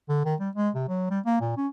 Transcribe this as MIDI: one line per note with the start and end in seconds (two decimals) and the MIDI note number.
0.09 0.23 50
0.25 0.35 51
0.40 0.49 55
0.56 0.70 56
0.75 0.84 48
0.88 1.10 54
1.10 1.20 55
1.26 1.38 58
1.41 1.53 46
1.57 1.67 61